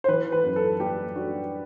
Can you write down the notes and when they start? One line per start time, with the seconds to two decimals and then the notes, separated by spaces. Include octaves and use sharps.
0.04 C5
0.08 E3 B4
0.32 B4
0.44 F#2
0.56 A4
0.80 G3 G4
1.16 D4 F#4